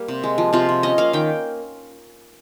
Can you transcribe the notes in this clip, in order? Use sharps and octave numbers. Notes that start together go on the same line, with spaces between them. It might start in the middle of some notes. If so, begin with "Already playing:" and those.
Already playing: G3 A#3
C3
G#3
F3
C3 F4
C3
C#4 D#5
A#3 F5
D#3 G5